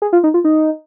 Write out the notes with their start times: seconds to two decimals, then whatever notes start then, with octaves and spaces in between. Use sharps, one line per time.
0.02 G#4
0.13 F4
0.24 D#4
0.34 F4
0.44 D#4